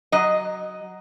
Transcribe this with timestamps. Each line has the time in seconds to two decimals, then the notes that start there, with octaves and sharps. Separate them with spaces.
0.12 F#3 D#5